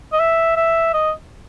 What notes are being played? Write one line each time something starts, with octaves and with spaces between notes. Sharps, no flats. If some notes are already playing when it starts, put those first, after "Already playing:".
D#5
E5
E5
D#5